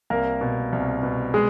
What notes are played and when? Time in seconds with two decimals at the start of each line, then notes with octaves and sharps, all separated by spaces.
0.10 C2 A#3 A#4
0.41 B2
0.72 C2
1.03 B2
1.34 G#3 G#4